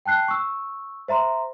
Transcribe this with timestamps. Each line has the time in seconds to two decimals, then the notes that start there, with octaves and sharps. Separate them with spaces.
0.06 G5 A5 F#6 C7
0.28 C#6 E6
1.08 C5 E5 A#5 C6